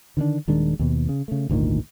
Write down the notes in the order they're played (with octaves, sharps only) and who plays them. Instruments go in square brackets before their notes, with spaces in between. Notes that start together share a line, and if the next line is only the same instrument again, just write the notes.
[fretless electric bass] D3 D#3 B3 D4
D#1 D#3 G#3 D4
D#2 B2
C#3
C#3 A3
G#1 D2 A#2 D#3